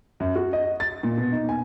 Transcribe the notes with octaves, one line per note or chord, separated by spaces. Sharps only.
F#2
F#4
D#5
A6
A#2
B2
D#4
G#5